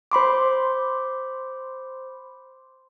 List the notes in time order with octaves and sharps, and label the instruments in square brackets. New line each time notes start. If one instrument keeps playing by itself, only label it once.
[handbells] C5 B5 C6 D6